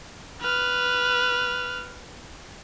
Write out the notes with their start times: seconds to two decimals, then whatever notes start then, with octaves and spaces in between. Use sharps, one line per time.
0.41 B4 F6